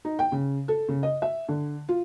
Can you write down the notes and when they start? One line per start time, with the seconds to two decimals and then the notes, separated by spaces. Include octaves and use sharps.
0.05 D#4
0.19 G5
0.32 C#3
0.68 A4
0.89 C#3
1.03 D#5
1.22 E5
1.49 D3
1.89 F4